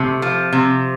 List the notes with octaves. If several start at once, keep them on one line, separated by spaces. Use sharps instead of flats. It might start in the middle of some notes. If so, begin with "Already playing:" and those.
Already playing: C3 A3
F3
C3